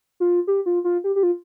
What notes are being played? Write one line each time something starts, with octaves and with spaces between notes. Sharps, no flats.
F4
G4
F4
F4
G4
G4
F4